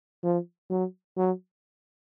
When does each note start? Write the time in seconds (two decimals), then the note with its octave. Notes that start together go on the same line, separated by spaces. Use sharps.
0.24 F3
0.70 F#3
1.17 F#3